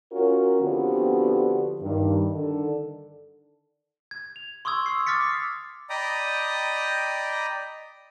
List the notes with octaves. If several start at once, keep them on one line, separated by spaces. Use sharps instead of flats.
C#4 F4 F#4 A#4
D3 F3 B3 C4 F#4 G4
G2 D#3
D3 D#3 D4 A4
G#6
F7
C6 C#6 D#6 E6 G#6
E6 C7
D6 F6 A6 B6 C#7
D5 D#5 G5 A#5 B5 D#6